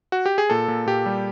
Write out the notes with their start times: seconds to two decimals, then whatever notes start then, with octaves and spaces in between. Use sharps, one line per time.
0.12 F#4
0.26 G4
0.38 G#4
0.50 A#2 A4
0.68 A#2
0.86 A#2 G4
1.06 G3